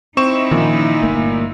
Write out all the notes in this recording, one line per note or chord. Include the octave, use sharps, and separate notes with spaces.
C4 D#4 E4 C#6 E7
A#2 D#3 F3 C#4
G1 A3 A#3